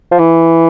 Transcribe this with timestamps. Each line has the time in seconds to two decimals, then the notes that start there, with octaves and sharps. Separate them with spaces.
0.11 F3
0.19 E3